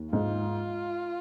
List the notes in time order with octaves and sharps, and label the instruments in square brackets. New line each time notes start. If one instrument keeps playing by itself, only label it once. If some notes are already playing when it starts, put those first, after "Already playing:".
Already playing: [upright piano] D#2
[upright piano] G#2 [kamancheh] F4